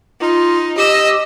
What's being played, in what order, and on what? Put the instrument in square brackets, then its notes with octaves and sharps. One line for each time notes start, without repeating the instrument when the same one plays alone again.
[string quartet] D#4 [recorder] F4
[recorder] G4 [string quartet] D#5 E6